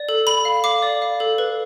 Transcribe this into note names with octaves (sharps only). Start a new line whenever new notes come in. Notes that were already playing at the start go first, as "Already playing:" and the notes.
Already playing: D5
A4
A4 B5
F5
F5 D6
D5
F5
A4
B4